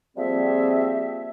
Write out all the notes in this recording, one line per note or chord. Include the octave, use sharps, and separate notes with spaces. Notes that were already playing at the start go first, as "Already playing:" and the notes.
F3 G3 A#3 C4 G#4 E5